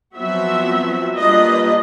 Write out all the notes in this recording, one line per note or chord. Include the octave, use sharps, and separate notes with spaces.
F3 F#3 B3 C4 F#4 E5
G3 A#3 D4 F4 B4 D#5